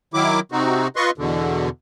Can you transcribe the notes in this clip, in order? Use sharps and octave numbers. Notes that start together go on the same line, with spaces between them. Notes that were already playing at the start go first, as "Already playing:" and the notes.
D#3 F#3 E4 D6
C3 C4 D#4 F#4
F4 B4 D#5 C6 C#6
E2 B2 D3